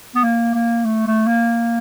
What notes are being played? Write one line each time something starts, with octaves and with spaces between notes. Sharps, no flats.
B3
A#3
A#3
A3
A3
A#3